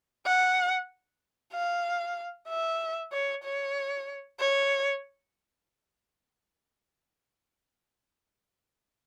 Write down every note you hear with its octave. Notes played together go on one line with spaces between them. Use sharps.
F#5
F5
E5
C#5
C#5
C#5